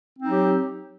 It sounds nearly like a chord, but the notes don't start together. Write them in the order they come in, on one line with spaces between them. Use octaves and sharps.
C4 D#4 F#3 G4